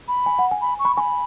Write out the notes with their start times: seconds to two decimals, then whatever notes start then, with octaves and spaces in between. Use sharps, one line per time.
0.08 B5
0.26 G#5
0.39 F#5
0.51 G#5
0.62 B5
0.79 C#6
0.85 B5
0.97 G#5 B5 C#6